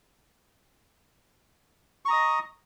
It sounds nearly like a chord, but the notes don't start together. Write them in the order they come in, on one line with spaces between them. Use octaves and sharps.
C#6 A#5 D#6 D#5